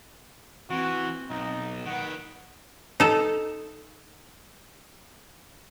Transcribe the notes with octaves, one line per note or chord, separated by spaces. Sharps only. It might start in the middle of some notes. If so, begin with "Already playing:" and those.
E3 C4 F#4
B1 D#4
D#3 B4 F#5 D7
D#4 A4